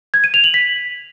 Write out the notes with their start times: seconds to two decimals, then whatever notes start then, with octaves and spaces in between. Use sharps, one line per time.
0.14 G#6
0.24 D#7
0.34 F7
0.44 F#7
0.54 B6